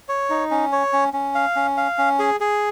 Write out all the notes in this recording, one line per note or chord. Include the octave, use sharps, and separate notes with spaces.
C#5
D#4
C#4
C#5
C#4
C#4
F5
C#4
F5
C#4
G#4
G#4